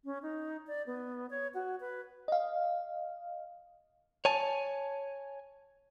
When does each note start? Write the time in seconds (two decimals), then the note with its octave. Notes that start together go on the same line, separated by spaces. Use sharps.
0.05 C#4
0.22 D#4
0.67 D5
0.87 B3
1.30 C#5
1.54 F#4
1.80 B4
2.28 D#5 F5
4.25 C#5 G#5 A5